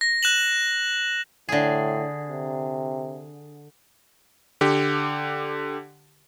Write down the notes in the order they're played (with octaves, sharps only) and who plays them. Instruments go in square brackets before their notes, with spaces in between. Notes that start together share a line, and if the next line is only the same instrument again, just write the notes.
[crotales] A#6
F#6 E7 F#7
[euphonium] A2 [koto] D3 G#4
[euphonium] C3
[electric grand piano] D3 G4